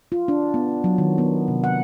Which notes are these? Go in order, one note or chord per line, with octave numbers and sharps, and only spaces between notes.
F4
D4
B3
F#3
D#3
B3
C3
F#5